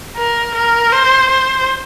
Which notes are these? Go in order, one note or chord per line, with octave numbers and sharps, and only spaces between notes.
A#4
A#4
C5
C5